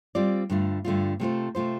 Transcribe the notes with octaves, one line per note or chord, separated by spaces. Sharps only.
G3 C4 F4 D5
G2 D3 A3 F4
G2 D3 A3 F4
C3 A3 F4 C5
C3 A3 F4 C5